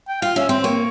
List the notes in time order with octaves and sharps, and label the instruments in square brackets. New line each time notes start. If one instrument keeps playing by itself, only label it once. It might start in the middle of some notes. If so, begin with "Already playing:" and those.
[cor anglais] G5
[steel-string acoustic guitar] F4 [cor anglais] F5
[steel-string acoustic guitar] C#4 [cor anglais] E5
[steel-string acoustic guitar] C4 [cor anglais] C5
[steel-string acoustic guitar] A#3 [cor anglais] C#5